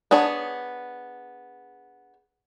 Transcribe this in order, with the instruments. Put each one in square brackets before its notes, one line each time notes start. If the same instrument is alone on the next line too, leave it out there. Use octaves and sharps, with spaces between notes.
[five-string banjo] B3 D4 G#4 C#5